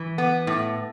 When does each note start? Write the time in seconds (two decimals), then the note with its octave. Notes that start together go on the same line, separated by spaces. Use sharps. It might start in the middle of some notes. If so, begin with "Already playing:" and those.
Already playing: E3
0.18 B3
0.47 A2